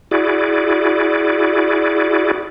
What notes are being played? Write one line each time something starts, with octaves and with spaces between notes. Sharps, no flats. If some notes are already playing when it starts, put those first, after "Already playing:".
E4 F#4 G#4 D5